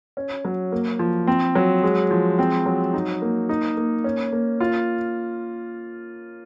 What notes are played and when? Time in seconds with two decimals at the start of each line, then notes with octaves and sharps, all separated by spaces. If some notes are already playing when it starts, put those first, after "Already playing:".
0.17 C#4
0.45 F#3
0.72 A#3
0.99 F3
1.27 C4
1.55 F#3
1.83 G#3
2.11 F3
2.39 C4
2.66 F#3
2.94 D#4
3.22 A#3
3.49 D#4
3.77 A#3
4.04 C#4
4.32 A#3
4.60 F4